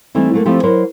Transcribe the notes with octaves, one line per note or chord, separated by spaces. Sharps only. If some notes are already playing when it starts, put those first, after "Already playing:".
E3 G3 A3 C4 D#4 E4
F#3 A3 A#3
F3 A3 C4 E4 G4
F#3 E4 A#4 C5 D5